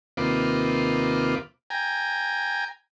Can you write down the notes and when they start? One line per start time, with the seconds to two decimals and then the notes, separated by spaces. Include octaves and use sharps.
0.17 D#2 C3 A#3 F4 B4 D6
1.70 G5 G#5 A#5